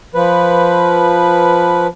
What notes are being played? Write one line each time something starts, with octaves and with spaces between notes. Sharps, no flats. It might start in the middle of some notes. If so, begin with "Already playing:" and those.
F3 B4